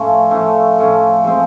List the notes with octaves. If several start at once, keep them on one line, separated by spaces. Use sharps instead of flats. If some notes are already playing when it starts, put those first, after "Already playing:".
Already playing: A2 F3 A3 C#4
A2 F3 A3 C#4
A2 F3 A3 C#4
F3 G#3 C4